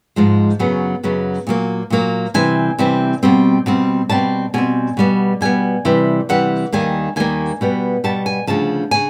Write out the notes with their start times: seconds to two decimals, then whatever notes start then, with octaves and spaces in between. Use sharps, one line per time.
0.16 G#2 F3 G#3
0.59 F#2 C#3 F#3 B3
1.04 F#2 C#3 F#3 B3
1.47 A#2 F#3 A#3
1.90 A#2 F#3 A#3
2.34 C3 E3 G3 C4 G#5
2.79 C3 E3 G3 C4
3.23 B2 G3 C4
3.66 B2 G3 C4
4.10 B2 G3 C4 A5
4.54 B2 G3 C4 G#5
4.97 B2 G3 B3
5.41 B2 G3 B3 G#5
5.85 C3 E3 G3
6.29 C3 E3 G3 F#5
6.72 D#2 D#3 G3 A#3 G#5
7.16 D#2 D#3 G3 A#3 G#5
7.61 B2 G3 B3
8.04 B2 G3 B3 A5
8.26 G#5
8.47 D2 C#3 F3 A5
8.91 C#3 G#5